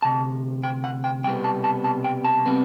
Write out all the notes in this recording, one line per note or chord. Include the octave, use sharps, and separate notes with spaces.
D2 C3 A5
G5
F#5
G5
C2 B2 G3 B3 G5
A5
A5
A5
G5
A5
C3 G3 B3